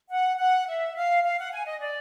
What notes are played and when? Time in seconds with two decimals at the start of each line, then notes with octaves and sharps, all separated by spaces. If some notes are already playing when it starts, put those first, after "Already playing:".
0.11 F#5
0.39 F#5
0.68 E5
0.96 F5
1.24 F5
1.39 F#5
1.52 G#5
1.67 D#5
1.80 D5